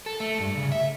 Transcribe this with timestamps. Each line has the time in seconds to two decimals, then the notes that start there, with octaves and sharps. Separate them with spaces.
0.06 A4
0.20 A3
0.40 G2
0.57 C#3
0.72 E5